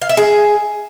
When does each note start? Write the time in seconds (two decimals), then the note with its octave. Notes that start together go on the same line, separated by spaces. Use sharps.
0.02 F5
0.09 E5
0.17 G#4